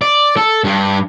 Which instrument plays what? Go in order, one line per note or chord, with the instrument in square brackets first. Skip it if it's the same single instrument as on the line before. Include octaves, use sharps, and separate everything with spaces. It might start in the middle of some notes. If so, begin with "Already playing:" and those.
[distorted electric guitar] D5
A4
G2